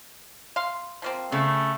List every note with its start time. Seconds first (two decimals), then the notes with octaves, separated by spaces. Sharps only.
0.56 F5 C6
1.02 F3 A#3 C4
1.32 C#3 A3